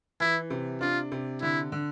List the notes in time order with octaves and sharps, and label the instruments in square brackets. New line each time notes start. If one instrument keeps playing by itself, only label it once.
[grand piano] E3 [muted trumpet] E4
[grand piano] C3
[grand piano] D4 [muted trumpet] F4
[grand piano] C3
[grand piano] D3 [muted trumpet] E4
[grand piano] D3